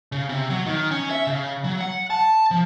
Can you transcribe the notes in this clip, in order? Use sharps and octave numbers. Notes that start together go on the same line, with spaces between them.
C#3
C3
F#3
D#3
C#4
E5
C#3
F#3
F#5
A5
F3